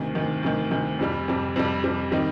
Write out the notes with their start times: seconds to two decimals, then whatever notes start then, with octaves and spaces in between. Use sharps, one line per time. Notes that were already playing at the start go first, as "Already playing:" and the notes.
Already playing: D2 C3 D#3
0.15 D2 C3 D#3
0.43 D2 C3 D#3
0.71 D2 C3 D#3
0.99 F2 C3 G3
1.28 F2 C3 G3
1.56 F2 C3 G3
1.84 F2 C3 G3
2.12 D#3 G3 C4 D#4